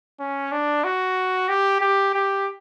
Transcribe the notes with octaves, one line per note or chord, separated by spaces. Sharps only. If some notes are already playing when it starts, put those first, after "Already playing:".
C#4
D4
F#4
G4
G4
G4